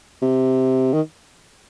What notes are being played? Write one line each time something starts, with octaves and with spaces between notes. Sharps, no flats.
C3
D#3